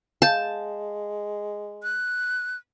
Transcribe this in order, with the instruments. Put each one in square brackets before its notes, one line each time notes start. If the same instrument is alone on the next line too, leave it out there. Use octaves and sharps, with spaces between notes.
[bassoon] G#3 [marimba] F5 G6 [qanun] A5
[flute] F#6